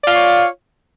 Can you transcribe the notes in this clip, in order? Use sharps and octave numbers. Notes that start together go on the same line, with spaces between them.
F4 C#5 D5 F5